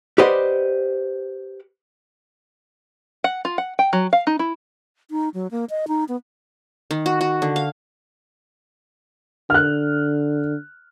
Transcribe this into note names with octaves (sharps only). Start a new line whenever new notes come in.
G4 B4 C5 D5 D#5 F#5
F#5
F4
F#5
G5
F#3
F5
D#4
E4
D#4
F#3
A#3
D#5
D#4
B3
D#3
F#4
F#4
D3
F5
D3 F6 F#6